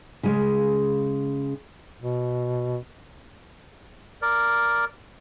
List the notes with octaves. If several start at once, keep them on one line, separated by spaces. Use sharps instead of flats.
C#3 G#3
B2
A#4 D5